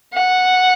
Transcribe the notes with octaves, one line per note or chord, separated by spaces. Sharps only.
F#5